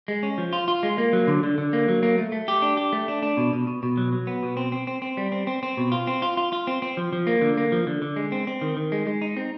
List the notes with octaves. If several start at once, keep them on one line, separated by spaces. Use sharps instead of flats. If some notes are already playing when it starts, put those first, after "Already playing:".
G#3
C#4
F3
F4
F4
G#3
A#3
F#3
D3
D3
D3
A#3
F#3
A#3
A3
A3
G4
D4
G4
A3
D4
D4
B2
B2
B2
B2
F#3
F#3
B3
B2
C4
C4
C4
C4
G3
C4
C4
C4
B2
F4
C4
F4
F4
F4
C4
C4
F3
F3
A#3
D3
A#3
F3
D3
D3
G#3
C4
C4
D#3
D#3
G#3
G#3
D#4
C4